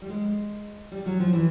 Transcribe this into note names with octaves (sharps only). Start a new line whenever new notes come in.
G3
G#3
G3
F#3
F3
E3